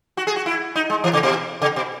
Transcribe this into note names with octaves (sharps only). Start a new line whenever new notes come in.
F#4
G#4
F#4
E4
D#4
G#3
E3
C#3
B2
C#3
B2